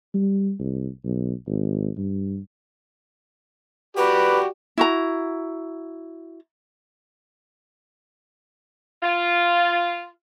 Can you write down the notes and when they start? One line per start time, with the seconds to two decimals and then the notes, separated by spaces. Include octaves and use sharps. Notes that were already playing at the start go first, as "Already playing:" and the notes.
0.14 G3
0.59 C2
1.04 B1
1.47 G#1
1.97 G2
3.97 F#4 G4 B4 D5
4.78 E4 F#4 A#5
9.03 F4